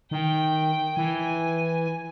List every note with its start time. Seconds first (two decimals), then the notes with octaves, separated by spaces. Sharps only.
0.11 D#3 G5
0.97 E3 G#5